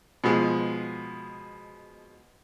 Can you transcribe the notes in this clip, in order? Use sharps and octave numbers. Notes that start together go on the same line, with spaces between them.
B2 F3 G#3